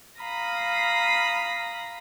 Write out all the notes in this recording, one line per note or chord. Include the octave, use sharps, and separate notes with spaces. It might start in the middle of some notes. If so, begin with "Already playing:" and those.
F5 A#5 B5 D#6